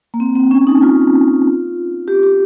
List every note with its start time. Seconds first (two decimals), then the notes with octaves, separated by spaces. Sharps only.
0.14 A#3
0.20 C4
0.35 C4
0.51 C#4
0.67 D#4
0.82 F4
2.08 G4
2.23 G4